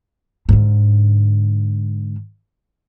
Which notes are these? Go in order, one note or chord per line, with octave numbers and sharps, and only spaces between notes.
G#2 D3